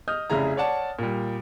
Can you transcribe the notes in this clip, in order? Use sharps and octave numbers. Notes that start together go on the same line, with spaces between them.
D#5 D#6 F6 G6
F1 C#3 E4 G#4 A#5
C#5 D5 F#5 A5
A#2 G3